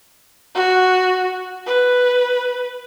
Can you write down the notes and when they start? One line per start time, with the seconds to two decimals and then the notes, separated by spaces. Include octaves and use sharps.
0.55 F#4
1.66 B4